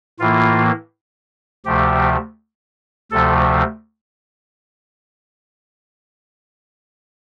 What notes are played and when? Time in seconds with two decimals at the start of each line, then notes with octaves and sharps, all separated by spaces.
0.20 A2 E3 A#3 F4
1.65 D2 C3 F3 A3 G4
3.11 D2 C3 F3 A3 A4